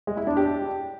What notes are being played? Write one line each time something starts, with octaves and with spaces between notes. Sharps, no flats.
G#3
E4
D4
G4